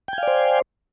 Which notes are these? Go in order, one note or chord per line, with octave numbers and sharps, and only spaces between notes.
C5 D5 F5 G5 G#5